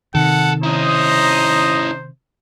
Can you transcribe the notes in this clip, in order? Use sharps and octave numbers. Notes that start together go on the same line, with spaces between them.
C3 D#3 A4 F#5
C#4 D#4 E4 C5 A#5 D#6